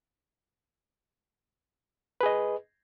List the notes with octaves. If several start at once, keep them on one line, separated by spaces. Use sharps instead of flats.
G#4 B4 D#5